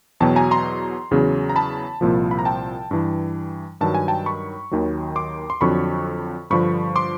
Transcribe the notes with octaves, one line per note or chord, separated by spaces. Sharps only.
E2 B2 F#3 G5 A5
G#5 A#5
A#5 C6
E2 C#3 F#3
A#5
A5 B5
C2 A#2 F3
B5
A#5
G5 A5
G2 E3
G2 D#3 F#3 A5
G#5
G5 A5
B5 C#6
D#2 D#3 F#3
C6 D6
C6
F2 D3 F#3 B5 C#6
G2 D3 F3 B5 C#6
C6 D6